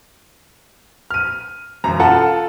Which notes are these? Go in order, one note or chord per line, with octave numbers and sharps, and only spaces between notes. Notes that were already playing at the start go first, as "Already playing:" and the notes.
F6 D#7
E1 F#2 A#5
F4 A4 F#5 A5